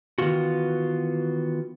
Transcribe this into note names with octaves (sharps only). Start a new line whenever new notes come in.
D#3 E3 B3 F4 F#4